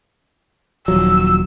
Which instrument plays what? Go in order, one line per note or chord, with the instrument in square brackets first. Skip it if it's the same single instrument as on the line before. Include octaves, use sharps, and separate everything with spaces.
[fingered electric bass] D#1 F3 F#3 [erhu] E6